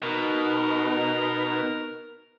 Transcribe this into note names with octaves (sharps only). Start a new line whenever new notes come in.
B2 D#4 A#4